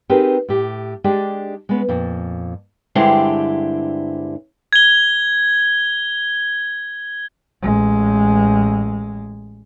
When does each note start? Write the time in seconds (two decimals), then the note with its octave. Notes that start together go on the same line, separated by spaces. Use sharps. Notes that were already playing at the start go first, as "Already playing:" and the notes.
0.09 C4 D#4 G4 G#4 A#4 B4
0.49 A2 G4
1.04 G#3 D4 G4 G#4 D5 G5
1.69 G#3 B3 C#4
1.88 F2 A#2
2.95 G2 D3 G#3 C4 E4 G4
4.73 G#6 G7
7.62 A1 G#3